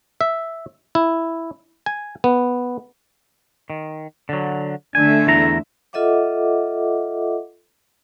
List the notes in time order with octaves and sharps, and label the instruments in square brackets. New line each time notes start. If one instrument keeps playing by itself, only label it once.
[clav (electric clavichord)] E5
E4
G#5
B3
[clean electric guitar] D#3
D3 F#3
[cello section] D3 A3 E5 [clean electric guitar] G#5
[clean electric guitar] E2 E4 A#5
[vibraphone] F4 A4 D#5 E5 F#5 D6